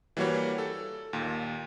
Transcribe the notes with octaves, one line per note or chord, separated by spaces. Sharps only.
E3 G3 A#3 F#4 C#5
A4
D#2 A#2